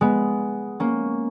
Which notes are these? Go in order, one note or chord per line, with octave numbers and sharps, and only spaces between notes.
G#3 B3
A#3 C#4